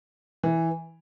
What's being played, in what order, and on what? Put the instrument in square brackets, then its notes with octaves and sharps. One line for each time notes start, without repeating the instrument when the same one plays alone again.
[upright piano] E3